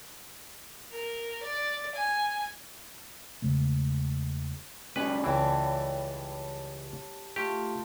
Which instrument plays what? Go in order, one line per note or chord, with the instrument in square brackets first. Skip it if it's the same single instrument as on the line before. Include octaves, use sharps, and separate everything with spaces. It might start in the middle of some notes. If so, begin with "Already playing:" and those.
[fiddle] A#4
D5
G#5
[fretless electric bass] E2 C#3 G#3 A3
[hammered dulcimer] G3 [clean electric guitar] G#3 C#4 F#4 [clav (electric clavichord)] B4
[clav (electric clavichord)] C#2 E3 [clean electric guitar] B4 C#5 G5 [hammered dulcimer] D5 E5 A5
[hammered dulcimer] A3 F4 [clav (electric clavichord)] G4